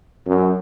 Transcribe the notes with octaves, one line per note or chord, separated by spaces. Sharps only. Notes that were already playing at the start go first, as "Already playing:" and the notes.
F#2